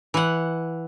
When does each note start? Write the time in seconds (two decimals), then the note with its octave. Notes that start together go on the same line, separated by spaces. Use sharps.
0.14 E3 F#5